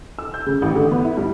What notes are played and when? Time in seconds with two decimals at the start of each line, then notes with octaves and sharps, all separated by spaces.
0.19 E6
0.34 G6
0.46 C#3
0.62 A1
0.76 D3
0.91 B3
1.04 E4
1.17 G2